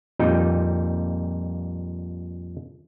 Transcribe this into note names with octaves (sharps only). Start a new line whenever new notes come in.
F2 A#2 G3 D#4